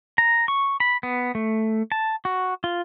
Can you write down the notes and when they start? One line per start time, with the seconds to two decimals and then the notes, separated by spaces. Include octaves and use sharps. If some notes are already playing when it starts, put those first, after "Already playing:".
0.18 A#5
0.48 C#6
0.80 B5
1.03 B3
1.35 A3
1.92 A5
2.25 F#4
2.64 F4